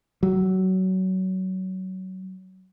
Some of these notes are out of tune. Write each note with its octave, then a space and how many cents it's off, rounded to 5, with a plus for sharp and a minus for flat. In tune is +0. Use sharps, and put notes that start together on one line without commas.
F#3 +20